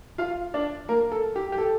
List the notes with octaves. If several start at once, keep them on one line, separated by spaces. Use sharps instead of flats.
F4 F5
D4 D5
A#3 A#4
A4
G4
G4
A4